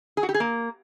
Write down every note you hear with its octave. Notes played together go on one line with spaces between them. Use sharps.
G#4
F#4
G4
G#4
A#3